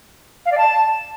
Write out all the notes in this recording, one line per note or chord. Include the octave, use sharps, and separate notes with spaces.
F5
D5
A5